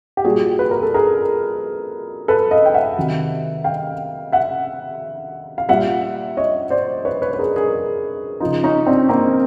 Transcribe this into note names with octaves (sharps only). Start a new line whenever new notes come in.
G4
A#2 G3 F#4 G#4
B4
A#4
A4
G#4 A#4
A4 B4
D#5 F5
G5
E5 F#5
C3 D#3 F#3
F5 G5
E5 F#5
F5
A#2 G3 E5 F#5
C#5 D#5
C5 D5
B4 C#5
B4 C#5
B4
G#4 A#4
G#4 A#4
C#3 F3 D#4 F4
C#4 D#4
C4 D4
A#3 C4